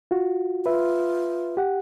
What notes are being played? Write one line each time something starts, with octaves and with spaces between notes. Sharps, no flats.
F4 F#4
F4 B4 E5
G4 F#5